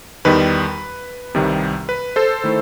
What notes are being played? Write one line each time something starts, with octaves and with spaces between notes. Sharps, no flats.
E2 D#3 G3 D#4 B4
C2 C3 D#3 G3
B4
A4 C5
D#3 A3 E4